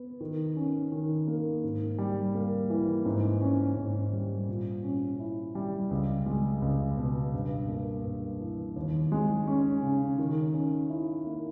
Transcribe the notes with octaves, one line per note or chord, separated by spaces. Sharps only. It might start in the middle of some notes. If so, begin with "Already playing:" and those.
Already playing: B3
D#3
C#4
D#3
A#3
G#2
G3
A#3
E3
G#2
C#4
G#2
G3
A#2
C#4
E4
G3
C#2
G#3
C#2
B2
G2
A#3
G2
E3
D#2
G#3
C#4
C#3
D#3
C#4
E4
A#3